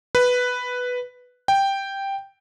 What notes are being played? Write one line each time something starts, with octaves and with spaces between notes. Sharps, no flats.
B4
G5